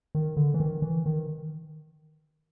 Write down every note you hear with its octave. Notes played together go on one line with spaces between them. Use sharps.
D#3
D3
E3
D#3
E3
D#3